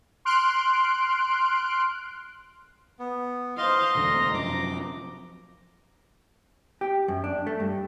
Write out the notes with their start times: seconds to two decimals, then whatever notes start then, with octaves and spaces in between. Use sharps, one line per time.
0.25 C6 F6 F#6 D7
2.99 B3
3.58 C5 D#5 F5 C6
3.95 E1 D2 D3 A#5
4.34 F#2 C3 F3 D6
6.81 G4
7.08 F#2
7.24 D4
7.47 A3
7.60 G2